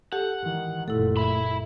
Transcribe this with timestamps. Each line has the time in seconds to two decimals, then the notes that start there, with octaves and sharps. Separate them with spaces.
0.13 G4 A4 F#5
0.43 G#2 D#3 E3
0.88 F#1 A#2 A3 E4 A4
1.17 E5 B5